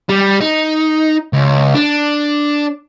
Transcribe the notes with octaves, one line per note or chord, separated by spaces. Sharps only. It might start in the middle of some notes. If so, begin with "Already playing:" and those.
G3
D#4
C#2
D4